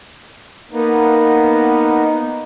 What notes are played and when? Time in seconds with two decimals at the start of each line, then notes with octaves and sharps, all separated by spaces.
0.71 A#3 B3 D#4